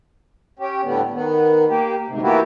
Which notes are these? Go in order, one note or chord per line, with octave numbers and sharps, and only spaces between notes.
C#4 G4
A2 D3 G3 B3
D#3 B3
A#3 G4
D2 G#2 C3
E3 A#3 B3 E4 F#4 G4